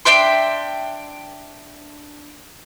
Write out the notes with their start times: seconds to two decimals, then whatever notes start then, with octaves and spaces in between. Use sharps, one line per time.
0.05 D4 E5 G5 C6